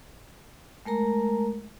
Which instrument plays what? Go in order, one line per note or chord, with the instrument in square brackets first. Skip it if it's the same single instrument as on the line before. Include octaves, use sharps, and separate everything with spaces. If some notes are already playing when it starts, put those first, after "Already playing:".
[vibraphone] G#3 A3 A#4 A#5